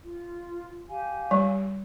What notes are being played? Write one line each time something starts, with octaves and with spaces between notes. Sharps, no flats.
F4
G4 F5 G#5
G3